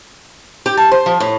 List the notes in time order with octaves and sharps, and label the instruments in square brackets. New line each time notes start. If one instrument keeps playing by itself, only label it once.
[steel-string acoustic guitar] G4
A5
C5
F3
A2